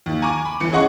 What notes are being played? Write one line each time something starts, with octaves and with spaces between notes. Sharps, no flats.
D#2
G#5 A#5 C#6 D6
B5
G1 E3 C#7
C#4 G#4 D#5 F#5 C6 C#6